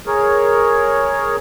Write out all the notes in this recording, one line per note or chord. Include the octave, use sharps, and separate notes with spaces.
G#4 A#4 C#5